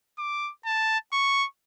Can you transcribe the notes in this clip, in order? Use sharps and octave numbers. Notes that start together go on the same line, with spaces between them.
D6
A5
C#6